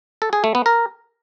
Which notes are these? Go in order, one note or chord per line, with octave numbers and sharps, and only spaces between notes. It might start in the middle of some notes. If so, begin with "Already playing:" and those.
A4
G#4
A3
B3
A#4